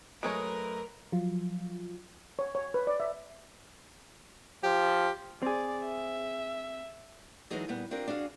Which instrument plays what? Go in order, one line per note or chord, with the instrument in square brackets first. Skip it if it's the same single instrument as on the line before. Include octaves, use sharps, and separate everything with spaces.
[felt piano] F#2 A3 D7 [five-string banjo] G#3 G#4 C#5 [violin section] A#4 [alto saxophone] B4
[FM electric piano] F3 F#3 F4
[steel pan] C#5
C#5
B4
D5
E5
[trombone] F3 [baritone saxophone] G4
[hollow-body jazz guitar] C4 G#4 [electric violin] D5
[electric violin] E5
[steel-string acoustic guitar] E3 F#3 G#3 D#4 G#4 A4
A#2 G3 B3
C4 D4 F4 G4 A#4
D4 F#4 G#4 E5 F5